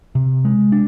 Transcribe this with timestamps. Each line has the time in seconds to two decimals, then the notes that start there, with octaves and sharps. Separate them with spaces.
0.15 C3
0.45 G#3
0.72 D4